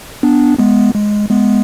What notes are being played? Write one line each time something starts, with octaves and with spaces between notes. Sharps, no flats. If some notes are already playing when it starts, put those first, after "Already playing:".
B3 D4
G#3 B3
G#3
G#3 B3